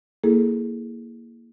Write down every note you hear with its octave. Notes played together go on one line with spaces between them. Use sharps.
A#3 E4 G#4 A4